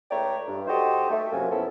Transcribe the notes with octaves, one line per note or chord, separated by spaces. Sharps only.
C#2 A3 C#5 D5 G5 A#5
G2
D#4 F#4 G4 A4 C5 D#5
A3
F#2 C3 F#3 A#3 F4 G#5
F3 B3 C#4 E4 A4